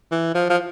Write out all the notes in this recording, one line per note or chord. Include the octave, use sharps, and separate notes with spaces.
E3
F3
F3